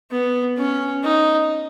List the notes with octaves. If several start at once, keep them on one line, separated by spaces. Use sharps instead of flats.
B3
C#4
D#4